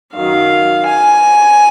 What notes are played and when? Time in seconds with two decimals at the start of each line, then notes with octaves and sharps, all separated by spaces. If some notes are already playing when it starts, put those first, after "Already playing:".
0.13 F#2 D#3 F#3 F5
0.86 G#5